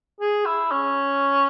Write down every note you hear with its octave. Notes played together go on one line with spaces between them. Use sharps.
G#4
E4
C#4